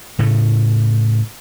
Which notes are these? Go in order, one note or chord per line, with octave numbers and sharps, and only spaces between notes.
A2 C#3 A3